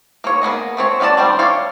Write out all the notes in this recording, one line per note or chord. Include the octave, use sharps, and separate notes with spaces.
A#3 C#5
A#3 B3 G#4 D#5
A3 C4 C#5
B3 C#4 F#4 D5 A5
D#3 G3 C4 C5 D5
D4 A4 C#5 D5 F5